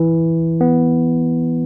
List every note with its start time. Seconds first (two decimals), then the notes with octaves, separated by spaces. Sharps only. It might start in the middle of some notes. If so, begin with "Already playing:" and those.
Already playing: E3
0.61 B3